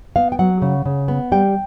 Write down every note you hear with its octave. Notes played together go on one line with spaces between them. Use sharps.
B3 F5
G5
F#3 F#5
C#3
C#3
B3
G3 G5